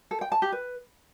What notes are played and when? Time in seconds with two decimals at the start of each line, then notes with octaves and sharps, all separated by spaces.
0.11 A4
0.21 G5
0.32 A5
0.42 G4
0.52 B4